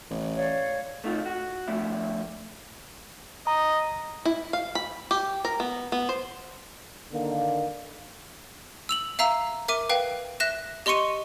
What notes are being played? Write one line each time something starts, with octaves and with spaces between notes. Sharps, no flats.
A1
C#5 D5 F5
A3 D#4 F4
F#4
F3 G3 A3 D4 E4
D#5 A#5
E4
F5
B5
G4
A#4
B3
B3
C5
D3 D#3 A#3
E6 F7 F#7
E5 F5 A#5 E6
A#4 E5 D6 D#7
B4 F5 G5
E5 F#6 A#6 E7
G4 D#5 C6 C#6 C#7 D#7